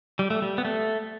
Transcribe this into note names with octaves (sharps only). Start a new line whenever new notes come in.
G3
A3
G3
B3
A3